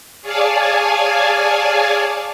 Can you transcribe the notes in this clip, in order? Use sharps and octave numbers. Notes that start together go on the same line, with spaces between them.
G#4 C#5 D5 F5 G#5 A5